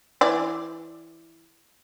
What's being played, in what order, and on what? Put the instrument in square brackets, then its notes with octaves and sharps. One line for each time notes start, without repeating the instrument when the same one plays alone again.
[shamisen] E3 D5